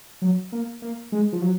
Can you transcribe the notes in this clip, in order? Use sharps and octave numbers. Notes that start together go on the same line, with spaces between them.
F#3
A#3
A#3
G#3
F3
F#3